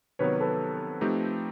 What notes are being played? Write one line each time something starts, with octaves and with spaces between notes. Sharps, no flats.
C3 D#3 F#3 B3 B4 C#5
A4 B4
F3 A3 C4 D#4 G4